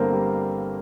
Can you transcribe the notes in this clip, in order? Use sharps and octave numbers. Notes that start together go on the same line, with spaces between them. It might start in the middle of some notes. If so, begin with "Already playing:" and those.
Already playing: G1 G2 D3 A#3 C4 A#4 C5
G3 G4